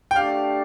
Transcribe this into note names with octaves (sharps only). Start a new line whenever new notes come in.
G5
A3 D4 G4 D5 F5